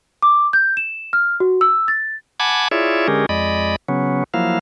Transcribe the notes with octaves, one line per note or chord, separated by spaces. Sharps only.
D6
G6
E7
F6
F#4
E6
A6
F#5 G#5 A5 B5 D6 G#6
E4 F4 G#4 C#5 D5 E5
D3 G#3 C#4 G4 G#4 A#4
F2 G#3 D5 D#5 B5
C#3 F#3 B3 C#4
F3 F#3 A#3 E4 F5